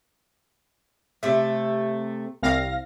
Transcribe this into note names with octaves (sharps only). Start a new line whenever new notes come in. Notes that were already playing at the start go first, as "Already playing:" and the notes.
C3 A3
C2 F5 A#6